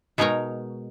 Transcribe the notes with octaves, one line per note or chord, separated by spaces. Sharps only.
B2 G#3 D#4 A#4 C#5